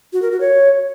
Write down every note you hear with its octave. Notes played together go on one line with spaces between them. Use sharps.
F#4
A#4
F#4
C#5